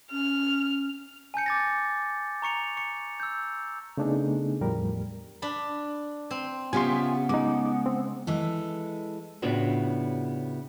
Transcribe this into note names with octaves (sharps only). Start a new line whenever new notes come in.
C#4 F6
G#5 A5 G6 C#7
D6 A6 A#6
A#5 C#6 C#7 F7
C#6 C#7
E6 G6
C#3 A3 B3 D4 D#4 G#4
E2 A2 F3 G3 G4 A#4
D4 B5
C4
C#3 B3 F4 G4 E5 G5 G#5 C6
G#3 D#4 D6
C4
E3 G#3 A4
A2 C#3 B3 D4 F4 F#4